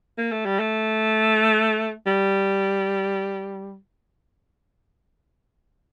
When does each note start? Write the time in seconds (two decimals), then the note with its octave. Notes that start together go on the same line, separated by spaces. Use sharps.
0.18 A#3
0.32 A3
0.45 G3
0.59 A3
2.06 G3